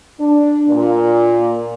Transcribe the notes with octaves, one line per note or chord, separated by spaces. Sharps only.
D4
A#2